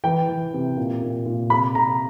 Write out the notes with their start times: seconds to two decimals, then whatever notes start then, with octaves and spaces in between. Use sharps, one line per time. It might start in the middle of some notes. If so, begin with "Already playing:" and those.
0.04 E3 G5
0.28 E3
0.54 C3
0.77 A#2
1.02 A#2
1.26 A#2
1.50 C3 B5
1.75 C3 A#5